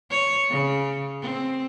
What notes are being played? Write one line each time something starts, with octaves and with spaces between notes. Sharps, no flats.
C#5
C#3
C4